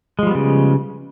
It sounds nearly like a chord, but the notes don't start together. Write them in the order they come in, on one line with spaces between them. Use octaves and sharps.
G#3 F3 G3 B3 C#3